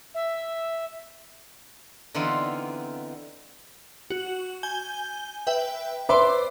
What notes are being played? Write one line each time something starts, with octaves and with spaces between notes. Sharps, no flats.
E5
D3 E3 B3 C4 D#4 F4
F#4
G#5 G6 G7
B4 E5 G5
B4 C5 D5 E5 C6 D6